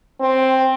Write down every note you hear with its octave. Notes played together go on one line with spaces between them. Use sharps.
C4